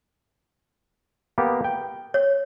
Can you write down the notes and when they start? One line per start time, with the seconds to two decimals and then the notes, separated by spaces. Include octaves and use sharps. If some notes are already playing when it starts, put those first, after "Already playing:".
1.38 A#3 B3 G4
1.64 G5
2.14 C#5